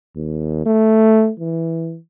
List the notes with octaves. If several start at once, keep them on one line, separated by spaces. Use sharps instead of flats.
D#2
A3
E3